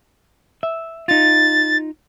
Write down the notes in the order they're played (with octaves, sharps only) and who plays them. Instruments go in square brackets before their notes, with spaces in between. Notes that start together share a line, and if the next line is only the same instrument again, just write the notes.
[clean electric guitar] E5
[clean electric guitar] D#4 F4 [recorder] A6